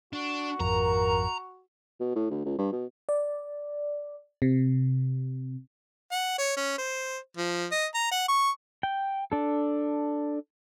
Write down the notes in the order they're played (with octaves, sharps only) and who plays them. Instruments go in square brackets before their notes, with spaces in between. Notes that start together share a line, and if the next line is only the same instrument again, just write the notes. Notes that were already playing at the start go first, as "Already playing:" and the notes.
[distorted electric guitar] D4 [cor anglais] F#4
[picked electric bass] G#1 F2 [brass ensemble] A#4 [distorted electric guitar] A#5
[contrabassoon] B2
A2
D2
C#2
G2
B2
[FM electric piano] D5
C3
[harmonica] F#5
C#5
C#4
C5
F3
D#5
A#5
F#5
C#6
[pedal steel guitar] G5
D4 A4